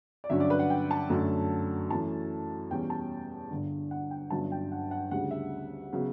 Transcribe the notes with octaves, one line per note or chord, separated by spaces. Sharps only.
D5
G2 D3 F#3 C#4 E5
D5
B4
F#5
G5
A5
F#2 D3 F#3 A3
F#2 E3 A3 A5
E2 B2 G3 C#4 G5
A5
G1 G2 D3
F#5
G5
G1 G2 D3 F#3 C#4 A5
G5
F#5
F#5
D2 C#3 G3 F#5
E5
C#3 F#3 B3